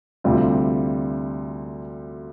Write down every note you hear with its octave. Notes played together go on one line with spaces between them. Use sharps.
D2 C3 G3 C4 F4